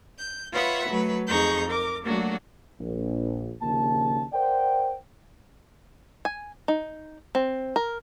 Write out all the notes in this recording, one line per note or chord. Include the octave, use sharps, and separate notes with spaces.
G6
F4 B4 C#5 E5 F#5 B5
F#3 A3 B4
F2 D#4 G#4 A#5 C#6 G6
A#4 D6
F#3 A3 A#3 D4 F#4
A#1
A#1 D#2 A#2 C#3 A5
A#4 C5 D5 F#5 G5
G#5
D#4
C4
A#4